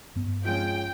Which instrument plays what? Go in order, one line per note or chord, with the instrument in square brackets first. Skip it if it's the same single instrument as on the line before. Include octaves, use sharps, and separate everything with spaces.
[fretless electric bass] G2 B3
[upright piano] F3 G#3 C#4 [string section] G5